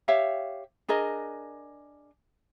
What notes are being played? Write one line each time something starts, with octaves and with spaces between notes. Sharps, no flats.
G4 C#5 E5 F5
D4 G#4 A#4 D#5